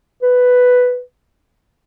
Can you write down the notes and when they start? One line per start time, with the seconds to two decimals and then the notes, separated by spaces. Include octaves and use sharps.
0.22 B4